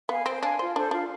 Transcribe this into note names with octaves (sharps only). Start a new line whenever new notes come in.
B3 F5 G#5
C4 C5
D4 F5 G#5
F4 C5
D4 A4 C5
D4 F4